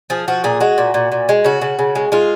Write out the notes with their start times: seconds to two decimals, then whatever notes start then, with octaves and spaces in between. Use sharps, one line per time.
0.10 F3 G#4
0.28 F3 F#4
0.44 A#2 G#4
0.60 G#3 F#4
0.78 A#2
0.94 A#2
1.12 A#2
1.29 G#3
1.44 C#3 F#4
1.61 C#3
1.79 C#3
1.95 G#3
2.12 G#3 F4